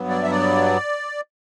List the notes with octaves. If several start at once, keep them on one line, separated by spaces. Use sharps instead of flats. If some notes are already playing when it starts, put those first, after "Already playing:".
Already playing: G2 F#3 B3
D5
E5
D5